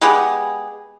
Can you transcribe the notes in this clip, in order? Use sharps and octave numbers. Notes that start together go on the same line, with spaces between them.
G#3 B3 G4 G#4